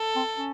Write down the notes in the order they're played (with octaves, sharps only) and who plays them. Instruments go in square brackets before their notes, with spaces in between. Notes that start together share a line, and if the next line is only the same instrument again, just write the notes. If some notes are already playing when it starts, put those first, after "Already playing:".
Already playing: [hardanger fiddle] A4
[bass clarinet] C4
C#4